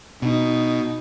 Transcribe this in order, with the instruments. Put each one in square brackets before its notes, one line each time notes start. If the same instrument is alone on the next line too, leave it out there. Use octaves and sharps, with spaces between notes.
[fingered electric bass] B2 [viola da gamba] D#4